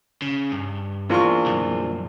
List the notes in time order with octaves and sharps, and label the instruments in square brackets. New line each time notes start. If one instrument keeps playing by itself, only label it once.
[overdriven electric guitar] C#3
G2
[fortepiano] E2 F4 C#6 [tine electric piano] F3 A#3 D4
[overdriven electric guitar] C2 F#2